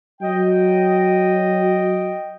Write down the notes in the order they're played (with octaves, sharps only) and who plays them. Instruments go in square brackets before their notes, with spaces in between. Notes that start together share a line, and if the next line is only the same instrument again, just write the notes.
[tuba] F#3 [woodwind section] D#5 G5